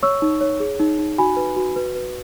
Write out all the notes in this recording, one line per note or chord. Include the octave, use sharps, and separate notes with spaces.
C#5 C#6 E6
D#4
C#5
G#4
D#4
D#4
F#4 G#5 B5
B4
F#4
B4
B4